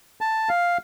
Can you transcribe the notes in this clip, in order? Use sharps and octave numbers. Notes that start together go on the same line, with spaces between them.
A5
F5